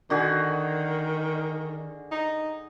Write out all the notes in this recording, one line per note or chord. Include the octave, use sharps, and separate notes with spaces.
D3 D#3 F#4 G#4
D#4